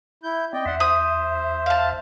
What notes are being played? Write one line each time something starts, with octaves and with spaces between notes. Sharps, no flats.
E4 G6
C4 D5 D#5 G5
E2 E5 F#5 C6
C5 D#6
F5 A5